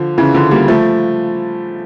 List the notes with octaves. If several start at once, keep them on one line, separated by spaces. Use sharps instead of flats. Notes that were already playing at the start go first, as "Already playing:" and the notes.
Already playing: D3 F3
C#3 E3
D3 F3
G3 A#3
F3 A3